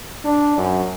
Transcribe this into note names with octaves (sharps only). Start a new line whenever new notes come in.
D4
F#2